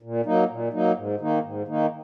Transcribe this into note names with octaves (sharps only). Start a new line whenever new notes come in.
A#2
F#3 A#3 D#4
A#2
F#3 A#3 D#4
G#2
D#3 A#3 D#4
G#2
D#3 A#3 D#4